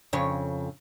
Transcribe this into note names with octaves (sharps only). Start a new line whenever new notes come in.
F2 C#3 C#5